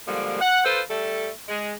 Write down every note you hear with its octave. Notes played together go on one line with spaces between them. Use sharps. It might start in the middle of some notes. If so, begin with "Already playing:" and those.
D3 F3 G3 G#3 A#3
F#5
F4 A4 B4 C5
G3 A3 A4
G#3